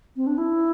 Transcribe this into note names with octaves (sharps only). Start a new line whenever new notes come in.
C4
D4
E4